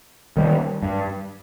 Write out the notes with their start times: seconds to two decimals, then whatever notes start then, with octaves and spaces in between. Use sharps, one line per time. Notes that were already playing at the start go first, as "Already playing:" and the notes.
0.37 D#3 G3
0.83 G2